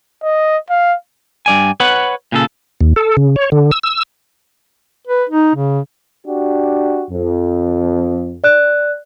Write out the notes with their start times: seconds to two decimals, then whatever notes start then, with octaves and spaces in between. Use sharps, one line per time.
0.23 D#5
0.70 F5
1.46 G2 D5 G#5
1.80 B4 C#5 F#5 B5
2.32 A#2 C#3 A4
2.81 D#2
2.96 A4
3.17 C#3
3.36 C#5
3.52 D3
3.71 E6
3.83 E6
5.07 B4
5.30 D#4
5.55 C#3
6.26 D4 F#4 G4
7.11 F2
8.44 D5 F#6